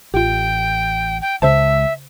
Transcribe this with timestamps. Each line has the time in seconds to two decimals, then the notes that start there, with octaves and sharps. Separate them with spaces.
0.14 A1 F4 G4 G5
1.21 G5
1.42 C#2 C#3 C5 E5 A5